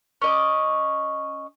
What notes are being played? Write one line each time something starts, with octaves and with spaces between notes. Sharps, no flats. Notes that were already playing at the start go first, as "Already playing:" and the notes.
C#4 D#5 D6